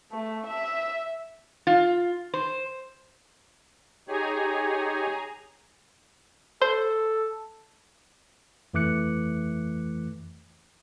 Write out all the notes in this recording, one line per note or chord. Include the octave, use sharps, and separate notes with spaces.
A3
E5
F4
C5
D#4 G4 G#4 C#5 G#5 A#5
A4 C5
F2 E3 A3 D6 F#6 C#7